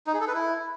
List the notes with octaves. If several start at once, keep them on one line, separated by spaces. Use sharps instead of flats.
D#4
G#4
A4
B4
E4